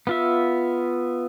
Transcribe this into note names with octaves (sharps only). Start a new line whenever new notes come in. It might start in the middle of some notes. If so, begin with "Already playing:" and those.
B3 F4 E5